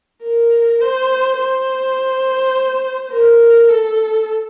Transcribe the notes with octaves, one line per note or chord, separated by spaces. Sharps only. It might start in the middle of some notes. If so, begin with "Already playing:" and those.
A#4
C5
C5
A#4
A4